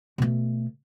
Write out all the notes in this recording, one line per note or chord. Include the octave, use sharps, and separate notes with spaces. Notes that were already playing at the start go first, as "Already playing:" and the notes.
B2 A3